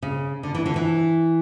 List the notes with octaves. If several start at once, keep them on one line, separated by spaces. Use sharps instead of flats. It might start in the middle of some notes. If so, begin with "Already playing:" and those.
C#3
D3
E3
D3
E3